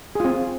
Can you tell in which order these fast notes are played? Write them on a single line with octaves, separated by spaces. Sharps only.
G#4 F4 C4